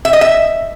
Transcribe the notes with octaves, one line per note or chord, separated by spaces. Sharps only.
E5
D#5
E5